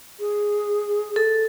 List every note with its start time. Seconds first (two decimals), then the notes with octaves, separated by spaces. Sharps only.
0.20 G#4
1.16 A4